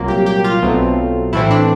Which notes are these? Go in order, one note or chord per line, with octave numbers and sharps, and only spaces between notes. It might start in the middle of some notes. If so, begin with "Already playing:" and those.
Already playing: C2 A#2 F#3 A#3
G4
G4
F4
B1 B2 F#3 A3 C4
A2 E3 A3 C4 E4
D4